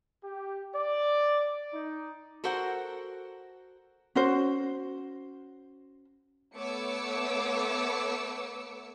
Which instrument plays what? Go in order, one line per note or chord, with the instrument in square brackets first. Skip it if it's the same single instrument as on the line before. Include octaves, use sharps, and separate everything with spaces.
[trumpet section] G4
D5
D#4
[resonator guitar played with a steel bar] F#4 A4 A#4 C5 F#5
[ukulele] C#4 F#4 C5
[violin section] A3 B3 C#5 D6 E6 C#7